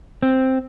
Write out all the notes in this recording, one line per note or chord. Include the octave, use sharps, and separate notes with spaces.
C4